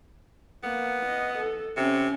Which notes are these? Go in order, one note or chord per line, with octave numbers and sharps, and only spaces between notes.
A#3 B3
D#5
A4
C3 C#4